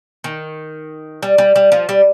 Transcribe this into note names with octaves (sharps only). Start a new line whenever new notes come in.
D#3
G3
G3
G3
F3
G3